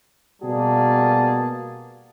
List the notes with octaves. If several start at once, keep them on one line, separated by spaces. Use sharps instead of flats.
B2 G3 A#3 F#4 G#4 A5